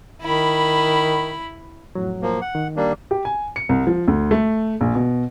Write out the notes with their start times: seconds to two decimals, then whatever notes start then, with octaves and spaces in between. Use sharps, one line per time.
0.22 D#3 E4 B5
1.95 F2 A2 F#3
2.22 F3 A#3
2.42 F#5
2.55 D#3
2.77 G3 A#3 D4
3.11 G4
3.25 G#5
3.56 C#7
3.69 C2
3.87 F3
4.08 D2
4.31 A3
4.81 A#1
4.95 B2